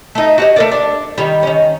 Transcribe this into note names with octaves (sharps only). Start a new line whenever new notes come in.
A3 D#4
F#4 G4 D#5
A3 A#4 D5
D4
D#3 G3
D#3 C#4